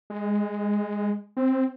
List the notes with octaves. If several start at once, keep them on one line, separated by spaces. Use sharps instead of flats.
G#3
C4